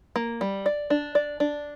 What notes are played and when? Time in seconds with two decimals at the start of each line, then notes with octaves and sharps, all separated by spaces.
0.16 A#3
0.41 G3
0.66 D5
0.90 D4
1.15 D5
1.40 D4